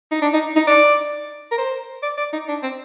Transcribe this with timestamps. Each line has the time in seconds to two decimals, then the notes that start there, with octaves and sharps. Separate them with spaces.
0.11 D#4
0.22 D4
0.33 D#4
0.56 D#4
0.67 D5
1.51 A#4
1.58 C5
2.03 D5
2.17 D5
2.33 D#4
2.48 D4
2.63 C4